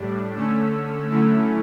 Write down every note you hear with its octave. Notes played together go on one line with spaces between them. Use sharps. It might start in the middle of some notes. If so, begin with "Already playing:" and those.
Already playing: A2 G3 D4
D3 A3 C#4 E6
D3 F#3 A3 C#4 E4